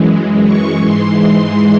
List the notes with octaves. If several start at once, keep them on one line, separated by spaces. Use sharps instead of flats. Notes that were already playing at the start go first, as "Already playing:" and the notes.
Already playing: F#2 E3 G#3
C#6
G#2 E3 G#3 C6